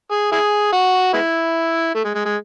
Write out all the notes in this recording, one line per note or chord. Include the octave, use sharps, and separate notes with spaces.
G#4
E4 G#4
F#4
G#3 B3 E4
A3
G#3
G#3
G#3